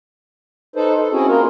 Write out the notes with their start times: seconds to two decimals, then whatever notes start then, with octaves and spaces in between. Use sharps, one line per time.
0.76 D#4 A4 B4 C5
1.00 A4
1.12 C4 C#4 E4 F#4 G#4
1.28 A#3 F4 A#4